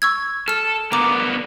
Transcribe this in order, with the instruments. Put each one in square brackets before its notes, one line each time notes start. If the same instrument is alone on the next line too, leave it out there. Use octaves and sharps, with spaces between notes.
[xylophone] C#6 E6 G#6
[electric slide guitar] A4 [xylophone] F6 E7
[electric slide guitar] D3 A#3 B3 [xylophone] A#5 D6